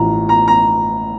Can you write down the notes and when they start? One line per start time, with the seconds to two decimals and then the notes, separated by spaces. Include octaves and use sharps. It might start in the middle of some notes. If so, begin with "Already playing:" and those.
Already playing: A1 A2 F3 A#5
0.29 A#5
0.48 A#5